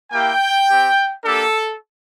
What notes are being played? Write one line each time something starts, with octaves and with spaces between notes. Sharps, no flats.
A#3 E4 G4 G5
C4 G4
A#3 D4 G4 A4